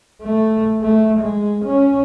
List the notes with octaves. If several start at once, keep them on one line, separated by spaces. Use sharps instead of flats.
A3
A3
G#3
C#4